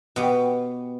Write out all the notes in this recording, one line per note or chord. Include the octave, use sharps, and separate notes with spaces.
B2 B3 G4